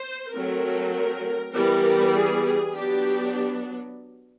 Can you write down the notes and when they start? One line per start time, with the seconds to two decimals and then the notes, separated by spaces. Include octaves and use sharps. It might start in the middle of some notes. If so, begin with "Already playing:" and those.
Already playing: C5
0.32 F#3 A3 C4 A#4
0.94 A#4
1.54 E3 G3 B3 A#4
2.16 G#4
2.46 G#4
2.77 F#3 B3 D4 G4